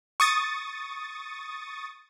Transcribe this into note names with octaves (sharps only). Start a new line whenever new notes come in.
C#6 D#6 A6